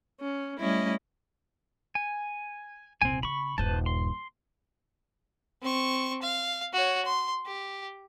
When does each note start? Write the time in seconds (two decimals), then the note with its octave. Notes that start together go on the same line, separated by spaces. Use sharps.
0.20 C#4
0.59 G3 A3 C#4 E4 D#5
1.95 G#5
3.02 D#1 C2 C4 G#5
3.23 C#3 B5 C#6
3.58 D#1 G2 B4 C5 A5
3.86 C6
5.63 C4 C#6
6.22 F5
6.74 F#4 C#5
7.05 C6
7.46 G4